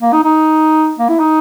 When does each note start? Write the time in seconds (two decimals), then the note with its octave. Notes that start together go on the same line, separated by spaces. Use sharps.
0.02 A#3
0.13 D#4
0.24 D#4
0.99 A#3
1.09 E4
1.19 D#4